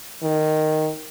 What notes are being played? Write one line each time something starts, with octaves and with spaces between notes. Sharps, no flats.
D#3